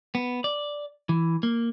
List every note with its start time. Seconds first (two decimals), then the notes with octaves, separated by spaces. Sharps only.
0.15 B3
0.44 D5
1.09 E3
1.43 A#3